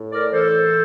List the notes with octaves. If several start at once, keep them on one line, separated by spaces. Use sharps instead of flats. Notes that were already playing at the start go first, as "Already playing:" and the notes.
Already playing: A2
A#4 D5
E3 A4 C5